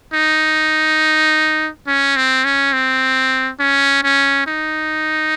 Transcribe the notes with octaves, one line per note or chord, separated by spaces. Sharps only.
D#4
C#4
C4
C#4
C4
C#4
C#4
D#4